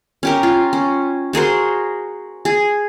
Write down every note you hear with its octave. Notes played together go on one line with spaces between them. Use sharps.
C#4 G4 A#4
F4
C#4
F#4 G#4 A#4 C5
G#4